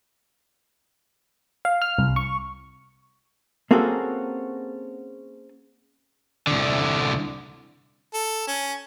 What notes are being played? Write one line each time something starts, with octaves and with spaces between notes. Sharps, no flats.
F5
F6
C2
C#6
A#3 C4 C#4 F#4 G#4 A4
C2 D3
A4
C#4